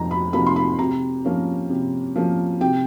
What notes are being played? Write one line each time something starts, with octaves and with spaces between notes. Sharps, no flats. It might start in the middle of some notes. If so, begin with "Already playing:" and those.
Already playing: F2 C3 F3 A#3 D#4 A#5
B5
C3 F3 A#3 D#4 B5
C6
B5
C3 A#5
F3 A#3 C#4
C3
F3 A#3 C#4
C3 G5